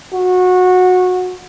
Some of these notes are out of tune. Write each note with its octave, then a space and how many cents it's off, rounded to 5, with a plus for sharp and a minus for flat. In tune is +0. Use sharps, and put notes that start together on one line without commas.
F#4 -20